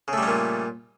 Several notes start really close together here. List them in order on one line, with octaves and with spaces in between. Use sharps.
C#3 A3 G3 C#4 A#2